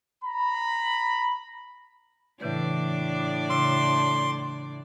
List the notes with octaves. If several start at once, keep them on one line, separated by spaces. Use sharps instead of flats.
A#5 B5
A2 C#3 E3 D4 B4 D5
C#3 C6